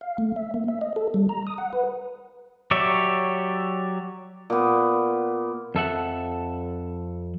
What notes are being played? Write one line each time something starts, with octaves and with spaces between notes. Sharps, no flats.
F5
A3
E5
A#3
E5
D#5
A4
G3
A#5
D#6
F#5
B4
F#3 G4 C#5 D5 E5
A#2 B3
F2 A4 E5 F#5